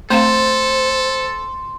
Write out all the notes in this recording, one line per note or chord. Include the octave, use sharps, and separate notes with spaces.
A3 C4 A4 C5 F5 C6